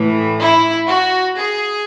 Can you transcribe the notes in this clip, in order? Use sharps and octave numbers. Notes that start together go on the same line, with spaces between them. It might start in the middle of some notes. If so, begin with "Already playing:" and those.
Already playing: A2 E3
E4
F#4
G#4